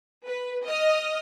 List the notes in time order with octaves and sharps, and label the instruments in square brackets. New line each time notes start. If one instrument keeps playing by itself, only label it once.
[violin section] B4
D#5 D#6 F6